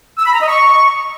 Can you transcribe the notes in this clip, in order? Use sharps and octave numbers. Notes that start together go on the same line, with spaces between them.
E6
B5
A#5
D#5
C#6